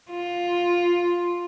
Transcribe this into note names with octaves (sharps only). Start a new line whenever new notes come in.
F4